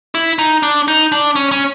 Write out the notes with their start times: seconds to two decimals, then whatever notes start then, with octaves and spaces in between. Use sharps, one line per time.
0.15 E4
0.39 D#4
0.63 D4
0.88 D#4
1.12 D4
1.36 C#4
1.52 C#4